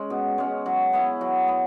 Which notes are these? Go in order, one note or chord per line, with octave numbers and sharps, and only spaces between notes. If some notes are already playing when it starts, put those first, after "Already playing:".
Already playing: G#3 C#4
B2
G#3 C#4
F#3
B3 E4
F#3
B3